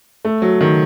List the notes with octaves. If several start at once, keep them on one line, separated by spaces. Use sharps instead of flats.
A3
F#3
D#3